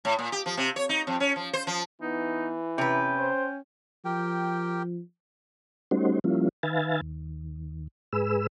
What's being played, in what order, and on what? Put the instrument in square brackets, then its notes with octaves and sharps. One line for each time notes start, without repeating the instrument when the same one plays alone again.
[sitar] A2
A#2
G4
F3
C3
C#5
D#4
F2
C#4
F3
C5
F3
[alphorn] E3 [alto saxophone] B3 [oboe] D#4
[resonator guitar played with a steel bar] C3 B4 [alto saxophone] C#4 [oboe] G5
[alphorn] C5
[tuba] F3 [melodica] G4 A#4 G5
[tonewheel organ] G3 A3 C#4 D#4 F#4 C5
F3 G3 A#3 C#4 E4 F4
D#3 B4 E5 F5 G#5 A6
D#2
G#2 G#4 B4 E6